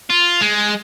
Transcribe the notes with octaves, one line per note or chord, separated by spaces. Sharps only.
F4
G#3